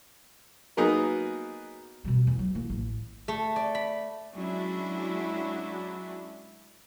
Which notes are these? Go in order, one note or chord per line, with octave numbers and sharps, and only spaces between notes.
F#3 A#3 B3 D#4 G#4
B2 G3
E2
F#3
A#3 E4
A1
A3
D5
B5
F#3 G#3 C#4 D4 E4 F#4